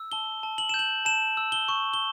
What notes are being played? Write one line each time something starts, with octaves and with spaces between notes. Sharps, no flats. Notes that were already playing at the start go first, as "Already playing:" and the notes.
Already playing: E6
A5 G7
A5
F#7
G6 E7
F#7
A5 E7
E6
G7
C#6
G7